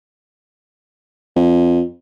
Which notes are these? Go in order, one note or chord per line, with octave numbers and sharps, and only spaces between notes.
F2